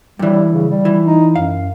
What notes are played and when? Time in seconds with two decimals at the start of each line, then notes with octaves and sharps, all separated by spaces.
0.19 G2 E3 G3
0.52 C#3
0.70 G3
0.85 E3
1.07 D#4
1.36 F#2 F5